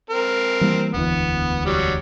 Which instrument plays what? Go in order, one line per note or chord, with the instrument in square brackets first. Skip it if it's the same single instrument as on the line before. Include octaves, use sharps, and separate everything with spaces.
[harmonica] C4 A#4
[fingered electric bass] E3 G3 A#3
[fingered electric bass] E1 D2 E3 [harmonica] B3
[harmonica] F#3 G3